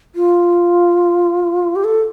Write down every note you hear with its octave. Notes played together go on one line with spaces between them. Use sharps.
F4
G4
A4